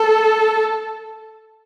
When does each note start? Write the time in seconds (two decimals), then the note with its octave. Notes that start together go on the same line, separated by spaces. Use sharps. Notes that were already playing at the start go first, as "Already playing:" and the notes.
Already playing: A4